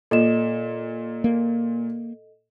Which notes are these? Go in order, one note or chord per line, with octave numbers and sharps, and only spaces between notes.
A#2 A4 D#5 E7
A#3